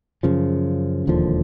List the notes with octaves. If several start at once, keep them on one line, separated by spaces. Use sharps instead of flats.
F#2 C#3 F3
E1 D#2 D3 F3